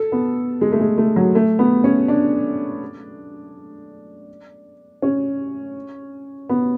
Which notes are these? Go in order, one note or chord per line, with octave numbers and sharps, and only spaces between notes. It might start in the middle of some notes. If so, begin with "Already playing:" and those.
Already playing: A4
B3
G#3
A3
G#3
A3
F#3
A3
B3
C#4
D4
C#4
B3